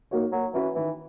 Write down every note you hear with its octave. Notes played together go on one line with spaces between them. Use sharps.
A#3 D#4 F#4 C#5
F#3 A#3
E3 C#4 F#4 B4
D#3 E3